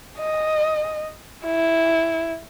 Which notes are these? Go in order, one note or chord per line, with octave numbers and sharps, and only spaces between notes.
D#5
E4